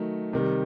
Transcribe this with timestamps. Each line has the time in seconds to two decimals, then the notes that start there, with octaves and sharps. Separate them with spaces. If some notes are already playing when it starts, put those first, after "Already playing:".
Already playing: D#3 F#3 A3
0.33 C3 D#3 G3